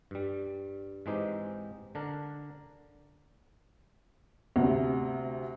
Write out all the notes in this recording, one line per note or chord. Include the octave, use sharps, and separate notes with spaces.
G2 G3
G#2 E3 G#3 C4 D#4 G4
D3 D4 A#4
D2 C3